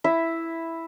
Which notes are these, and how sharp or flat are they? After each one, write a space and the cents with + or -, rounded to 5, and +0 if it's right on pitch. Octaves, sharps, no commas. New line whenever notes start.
E4 +0 E5 +0